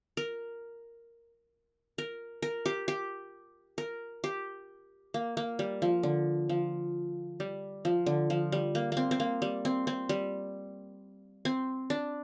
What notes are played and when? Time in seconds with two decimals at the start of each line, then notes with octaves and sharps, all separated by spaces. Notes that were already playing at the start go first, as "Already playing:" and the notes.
0.17 A#4
1.98 A#4
2.42 A#4
2.66 G4
2.88 G4
3.78 A#4
4.24 G4
5.14 A#3
5.37 A#3
5.59 G3
5.82 F3
6.03 D3
6.49 F3
7.40 G3
7.85 F3
8.06 D3
8.30 F3
8.52 G3
8.75 A#3
8.92 A#3 C4
9.11 C4
9.20 A#3
9.42 G3
9.65 C4
9.87 C4
10.09 G3
11.45 C4
11.90 D4